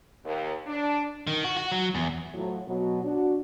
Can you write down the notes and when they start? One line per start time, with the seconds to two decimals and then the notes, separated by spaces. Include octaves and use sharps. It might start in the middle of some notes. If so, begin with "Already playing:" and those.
0.24 D#2
0.66 D4
1.27 D#3
1.44 F#4
1.57 F#4
1.72 F#3
1.94 E2
2.34 A2 F3 F#3
2.68 B2 F#3
3.03 D4 F#4